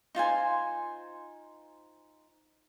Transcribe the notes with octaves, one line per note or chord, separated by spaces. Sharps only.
D#4 F4 C5 G#5